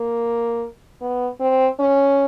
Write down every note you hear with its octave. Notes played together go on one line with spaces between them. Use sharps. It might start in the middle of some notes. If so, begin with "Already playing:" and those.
Already playing: A#3
B3
C4
C#4